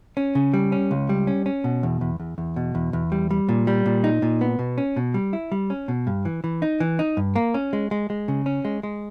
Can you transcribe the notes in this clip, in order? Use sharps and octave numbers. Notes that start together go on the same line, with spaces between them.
C#4
C#3
G3
C#4
C#2
G3
C#4
C#4
B2
E2
E2
E2
E2
B2
E2
E2
G3
G3
A#2
G3
A#2
D#4
A#2
B3
B2
C#4
B2
G3
E4
G3
C#4
B2
G2
E3
E3
D#4
E3
D#4
G2
A#3
C#4
G#3
G#3
G#3
C#3
C#4
G#3
G#3